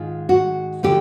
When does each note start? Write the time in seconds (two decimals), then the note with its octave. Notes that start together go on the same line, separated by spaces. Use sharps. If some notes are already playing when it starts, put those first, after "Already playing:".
Already playing: G#2 D#3 G#3 F4
0.29 F#4
0.83 D3 F3 A3 G4